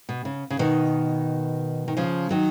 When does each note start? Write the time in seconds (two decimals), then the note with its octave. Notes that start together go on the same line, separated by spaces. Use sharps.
0.09 B2
0.25 C#3
0.50 C#3
0.59 B2 D#3
1.88 D#3
1.97 C#3 F3
2.30 D#3 F#3